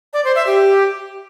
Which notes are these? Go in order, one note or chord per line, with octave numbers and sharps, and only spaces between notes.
D5
C5
E5
G4